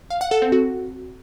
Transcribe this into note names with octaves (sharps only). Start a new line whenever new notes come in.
F5
F#5
A4
C4
F#4